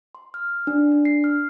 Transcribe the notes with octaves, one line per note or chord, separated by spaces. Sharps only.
C6
F6
D4
D4
C7
F6